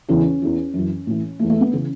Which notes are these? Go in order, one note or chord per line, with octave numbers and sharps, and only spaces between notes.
E2 C#3 E3 C#4
E2 E3
F#2 E3
A2 E3
E2 E3 A3
A3
B3
C#3 E3 C#4